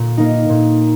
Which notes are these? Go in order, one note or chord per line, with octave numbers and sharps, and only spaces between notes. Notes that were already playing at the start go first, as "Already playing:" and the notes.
Already playing: A#2
A#3 D#4
A#2